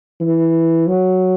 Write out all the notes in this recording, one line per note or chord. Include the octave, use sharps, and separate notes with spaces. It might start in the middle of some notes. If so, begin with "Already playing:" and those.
E3
F#3